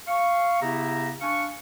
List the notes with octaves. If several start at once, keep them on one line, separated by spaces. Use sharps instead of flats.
F5 C#6
C#3 B3 E4 G4 E5 A#5
D4 F5 G#5 C#6